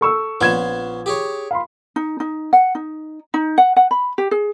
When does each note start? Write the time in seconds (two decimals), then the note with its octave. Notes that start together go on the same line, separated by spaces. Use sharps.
0.01 A4 C#6 E6
0.41 A#1 B3 C#4 C5 G#6 E7
1.06 G4 G#4 C#5
1.51 F5 B5 C6
1.96 D#4
2.20 D#4
2.53 F#5
2.75 D#4
3.34 D#4
3.58 F#5
3.76 F#5
3.91 B5
4.18 G4
4.31 G#4